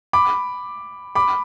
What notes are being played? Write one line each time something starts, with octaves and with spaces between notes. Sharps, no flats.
B5 D6
B5 D6